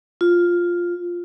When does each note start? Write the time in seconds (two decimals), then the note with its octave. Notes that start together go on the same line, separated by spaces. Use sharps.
0.21 F4